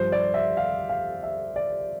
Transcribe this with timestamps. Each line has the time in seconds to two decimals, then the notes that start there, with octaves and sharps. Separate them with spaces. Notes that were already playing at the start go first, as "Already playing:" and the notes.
Already playing: G2 F3 C5
0.12 D5
0.34 E5
0.57 F5
0.89 F5
1.23 E5
1.56 D5